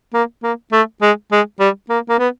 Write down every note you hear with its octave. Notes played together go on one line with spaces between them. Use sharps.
A#3
A#3
A3
G#3
G#3
G3
A#3
A#3
B3